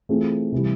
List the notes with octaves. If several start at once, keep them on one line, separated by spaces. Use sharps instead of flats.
E3 A3 C4 F4 G#4
C3 E3 G3